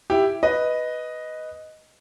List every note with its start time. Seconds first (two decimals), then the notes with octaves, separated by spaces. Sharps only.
0.10 E4 G4
0.43 B4 D#5